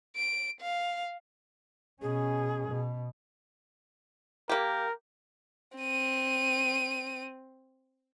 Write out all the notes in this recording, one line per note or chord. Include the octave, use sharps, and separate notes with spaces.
D7
F5
B2 C#4 G#4
B2
A#3 G4 A#4
C4 D#7